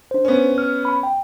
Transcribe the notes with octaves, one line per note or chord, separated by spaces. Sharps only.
D4 C5
B3 C#4
F6
B5
G5